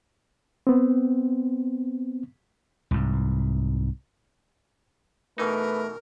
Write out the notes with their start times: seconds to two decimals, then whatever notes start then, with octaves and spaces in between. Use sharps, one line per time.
0.67 B3 C4
2.91 C2 G#2
5.38 B2 E3 A3 D#4 A#4 B4